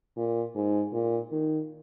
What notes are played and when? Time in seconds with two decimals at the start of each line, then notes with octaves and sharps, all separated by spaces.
0.17 A#2
0.55 G#2
0.93 A#2
1.32 D#3